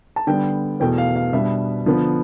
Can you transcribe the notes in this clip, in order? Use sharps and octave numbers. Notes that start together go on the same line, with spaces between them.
A5
D3 G3 B3 G5
E2 B2 A3 G5
F5
F5
B2 G3 B3 D4 E5
D3 F3 B3